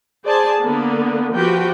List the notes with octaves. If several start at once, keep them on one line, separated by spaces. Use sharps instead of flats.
G#4 C5 D5 G#5 A5
D3 A#3 B3
F3 F#4 G4 B4 G5